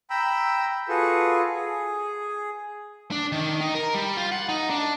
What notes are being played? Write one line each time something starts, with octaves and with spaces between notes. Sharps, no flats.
G5 A#5 B5 E6
F4 F#4 G#4 A4 B4
G#4
D4
D#3
D#4
A#4
G3
F4
F#5
D#4
D4